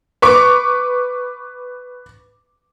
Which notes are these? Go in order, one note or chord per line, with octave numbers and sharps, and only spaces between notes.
B4 C#6 D6